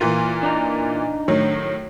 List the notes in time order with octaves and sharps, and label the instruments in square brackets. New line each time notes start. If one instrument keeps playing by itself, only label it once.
[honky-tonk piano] A#2 E3 A#4 [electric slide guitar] F4
[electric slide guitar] D4 D#4 A#5
[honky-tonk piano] A2 D#3 F#3